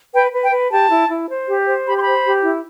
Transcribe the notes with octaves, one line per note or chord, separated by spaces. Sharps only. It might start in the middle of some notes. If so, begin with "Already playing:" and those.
B4 G5
B4
G5
B4
G4 A5
E4
E4
C5
G4
C5
G4 B5
C6
C5 B5
G4
E4